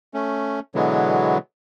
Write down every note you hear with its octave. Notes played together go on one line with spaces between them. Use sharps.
A3 C#4
B2 D3 E3 F#3 G#3 B3